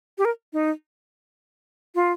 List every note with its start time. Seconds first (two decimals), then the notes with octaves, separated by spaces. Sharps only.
0.18 G4
0.25 A#4
0.53 D#4
1.95 F4